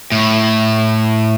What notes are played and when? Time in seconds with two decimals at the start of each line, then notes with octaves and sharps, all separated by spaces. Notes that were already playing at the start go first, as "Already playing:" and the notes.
0.12 A2